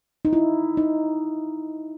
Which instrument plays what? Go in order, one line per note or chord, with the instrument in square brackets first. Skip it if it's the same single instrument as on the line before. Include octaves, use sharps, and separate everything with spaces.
[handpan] D#4
E4
D#4